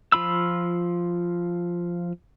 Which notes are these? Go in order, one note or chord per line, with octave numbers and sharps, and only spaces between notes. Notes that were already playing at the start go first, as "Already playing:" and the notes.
F3 F4 B5 E6